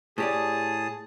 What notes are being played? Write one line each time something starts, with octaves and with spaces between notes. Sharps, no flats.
A2 G4 G#4 D5 A5 D#6